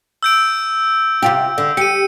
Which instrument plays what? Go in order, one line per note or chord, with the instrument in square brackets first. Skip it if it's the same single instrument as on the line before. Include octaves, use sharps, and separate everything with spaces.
[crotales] E6 G6 D7
[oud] C3 F4 G4
D3
[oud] G4 [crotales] C#7 D#7